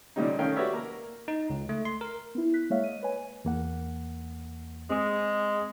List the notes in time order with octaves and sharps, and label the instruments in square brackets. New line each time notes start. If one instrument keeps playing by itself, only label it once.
[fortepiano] A#2 D3 G3 C#4 D#4
D#3 A3 C#4 A#4 F5 G5
F#4 G4 B4 C#5 D5 E5
A#3 A#4 A#5
[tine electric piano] D#4
C#2
A3
C6
A#4
[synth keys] B3 E4
F#6 B6
G#3 A#3 C#5 E5 F5
D#5 D#7
B4 C#5 G#5
[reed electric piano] E2 A#3 F#5
[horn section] G#3 [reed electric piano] C4 D#6